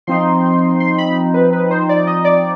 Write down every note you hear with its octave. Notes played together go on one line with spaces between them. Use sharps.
F3 C4 D#4 C6
C6
B5
B4
B4
C5
D5
D#5
D5